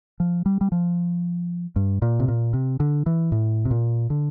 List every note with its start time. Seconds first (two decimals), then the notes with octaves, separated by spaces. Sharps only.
0.20 F3
0.46 G3
0.61 G3
0.72 F3
1.76 G2
2.02 A#2
2.20 C3
2.28 A#2
2.53 C3
2.80 D3
3.06 E3
3.32 A2
3.65 C3
3.71 A#2
4.10 D3